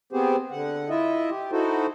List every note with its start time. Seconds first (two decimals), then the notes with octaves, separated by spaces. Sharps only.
0.13 B3 C4 G4 G#4 C5
0.51 D3 F#5
0.89 E4 F4 D#5 E5
1.30 G4
1.52 D#4 E4 F#4 A4 C5